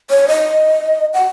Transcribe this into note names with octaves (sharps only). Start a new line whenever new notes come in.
C#5
D#5
F#5